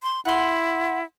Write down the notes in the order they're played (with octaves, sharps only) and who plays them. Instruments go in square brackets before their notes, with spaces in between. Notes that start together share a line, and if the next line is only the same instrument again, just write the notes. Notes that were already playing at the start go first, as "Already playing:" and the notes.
[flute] C6
[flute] E4 [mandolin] F#5 C6